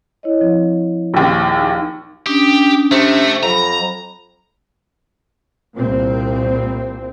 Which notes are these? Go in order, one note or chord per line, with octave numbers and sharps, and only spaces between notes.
E4 C#5 D#5
F3 C4
A#1 D#2
D#4
C#4 D4 G4 D#6
C3 A3
F2 F#3 A#5 B5
C2 A#2 C4